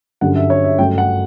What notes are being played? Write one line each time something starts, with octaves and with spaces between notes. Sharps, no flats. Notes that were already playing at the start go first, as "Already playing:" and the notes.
G1 F#2 D3 G3 F#5
E5
C#5
E5
G1 F#2 C#3 F#3 A3 G5
F#5